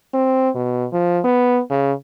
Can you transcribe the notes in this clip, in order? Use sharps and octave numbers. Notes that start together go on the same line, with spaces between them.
C4
B2
F3
B3
C#3